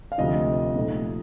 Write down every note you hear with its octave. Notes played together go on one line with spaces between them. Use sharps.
F5
D2 C3 F3 D#5
A#2 F3 A3 D#4